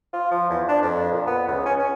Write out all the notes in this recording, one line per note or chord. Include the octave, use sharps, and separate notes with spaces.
F4
F3
E2
D4
F2
A#2
B3
C#2
C#4
C#4